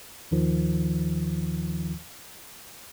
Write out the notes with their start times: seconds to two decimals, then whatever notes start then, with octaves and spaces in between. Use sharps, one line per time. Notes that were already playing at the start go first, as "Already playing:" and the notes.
0.31 D#2 D#3 F3